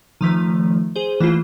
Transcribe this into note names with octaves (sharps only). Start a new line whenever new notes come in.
D#3 F3 A3
G#4 C5
E3 A3 A#3 F4